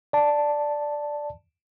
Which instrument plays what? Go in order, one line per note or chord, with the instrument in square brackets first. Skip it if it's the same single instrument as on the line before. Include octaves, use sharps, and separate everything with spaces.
[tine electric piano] D5 A5